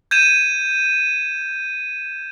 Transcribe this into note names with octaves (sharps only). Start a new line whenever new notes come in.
G6 G#6 D#7 E7